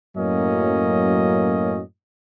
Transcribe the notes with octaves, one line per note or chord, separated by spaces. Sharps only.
F#2 A2 F#3 A#3 C#4 D#5